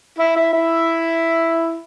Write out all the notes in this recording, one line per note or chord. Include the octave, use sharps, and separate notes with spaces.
E4 E5
E4 E5
E4 E5